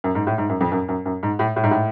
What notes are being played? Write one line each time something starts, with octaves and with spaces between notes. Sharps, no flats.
F#2
G#2
A2
G#2
F#2
F2
F#2
F#2
F#2
G#2
A2
A2
G#2
A2